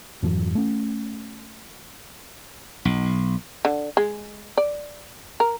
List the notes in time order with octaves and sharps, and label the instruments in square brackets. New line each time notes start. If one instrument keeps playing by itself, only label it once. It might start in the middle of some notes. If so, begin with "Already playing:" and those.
[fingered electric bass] F2 G#2 E3 F#3
A3 C#4
[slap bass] B1
[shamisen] D3
G#3
D5
A#4